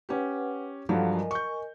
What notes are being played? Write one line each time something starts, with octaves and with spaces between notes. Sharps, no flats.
C#4 G4 B4 F#5
G2 F3 F#3 A4 F5 F#5
A#4 D#5 G#5
C#6 G6